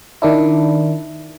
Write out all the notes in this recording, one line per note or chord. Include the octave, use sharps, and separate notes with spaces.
D#3 D4 E4